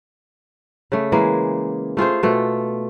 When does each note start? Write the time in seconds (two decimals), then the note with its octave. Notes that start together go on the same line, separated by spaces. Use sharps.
0.92 C#3 A3
1.12 E3 G#3 A#3
1.97 A3 F4 G#4 C5
2.23 B2 A3